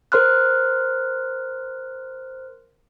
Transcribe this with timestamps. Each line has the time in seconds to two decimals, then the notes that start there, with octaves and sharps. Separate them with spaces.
0.12 A#4 C5 C6 F6 F#6